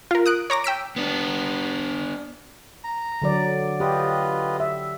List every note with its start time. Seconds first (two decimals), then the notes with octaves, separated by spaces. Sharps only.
0.11 F4 A#4
0.26 D#6 F#6 D7
0.50 C#5 A#5 D6 A#6
0.64 G5 E6 B6 D7
0.96 B3 D4
2.84 A#5
3.22 D3 F#3 D5
3.80 F4 G4 B4 D#5
4.60 E5